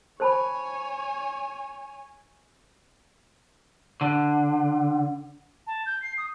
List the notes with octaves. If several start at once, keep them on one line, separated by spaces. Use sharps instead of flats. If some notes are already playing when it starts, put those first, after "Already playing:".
C5 C#5 G#5 A5 B5
D3
A5
G6
C7
D#6